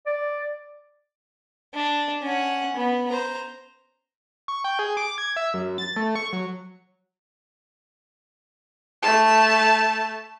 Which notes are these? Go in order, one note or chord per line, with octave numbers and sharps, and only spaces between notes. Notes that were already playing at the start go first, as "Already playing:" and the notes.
D5
D4
C#4 F#5
B3
C5 A#5
C#6
G5
G#4
D6
G#6
E5
F#2
A6
A3
C#6
F#3
A3 A5